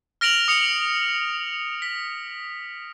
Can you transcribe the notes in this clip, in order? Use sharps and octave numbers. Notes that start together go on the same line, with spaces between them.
F6 A#6 D7 F7 F#7
D#6 C#7
B6